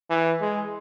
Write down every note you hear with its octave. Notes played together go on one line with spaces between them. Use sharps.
E3
G#3